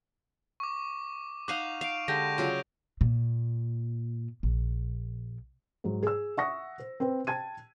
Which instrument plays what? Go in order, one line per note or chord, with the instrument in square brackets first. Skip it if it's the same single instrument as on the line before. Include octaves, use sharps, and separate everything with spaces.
[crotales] C#6 D6
[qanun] D#4 F5 F#5 [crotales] D6 D#7 F7
[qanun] F5 [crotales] D7 F7
[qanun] D3 G#3 G4 [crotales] G6 A#6
[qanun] C#3 F#3 F4
[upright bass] A#2
A#1
[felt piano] G#2 F#3
G#4 E6
E5 F#5 C#6 D#6 A#6
C5
C4 B4
G5 A5 G#6 D#7